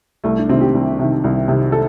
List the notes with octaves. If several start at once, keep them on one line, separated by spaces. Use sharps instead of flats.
C2 A3
D4
C3 D#3 C4
G4
C2
C3 D#3
C2
C3 D#3
A4